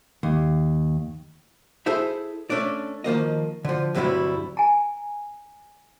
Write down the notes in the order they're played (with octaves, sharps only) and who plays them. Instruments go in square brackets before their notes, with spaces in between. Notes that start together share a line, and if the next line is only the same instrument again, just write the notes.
[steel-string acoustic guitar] D#2
[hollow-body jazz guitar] E4 G#4 A4 C5 E5
A3 C#4 D4 D5
D#3 F3 A#3 D#5
D3 F3
D2 G2 C3 F#3 G3 E4
[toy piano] G#5 A#5